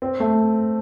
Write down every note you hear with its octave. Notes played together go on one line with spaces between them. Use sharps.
C4
A3